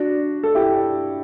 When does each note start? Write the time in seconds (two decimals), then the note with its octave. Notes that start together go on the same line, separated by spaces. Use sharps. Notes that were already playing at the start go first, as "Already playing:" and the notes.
Already playing: D4 F#4
0.43 A4
0.55 E4 G4